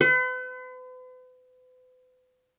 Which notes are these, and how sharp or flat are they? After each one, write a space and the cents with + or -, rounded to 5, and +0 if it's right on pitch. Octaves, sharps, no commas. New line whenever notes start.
B4 +45